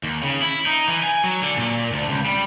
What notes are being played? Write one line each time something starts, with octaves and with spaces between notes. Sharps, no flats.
D#2
C#3
E4
D#4
E3
G#5
F#3
D3
A#2
D2
C#2
G3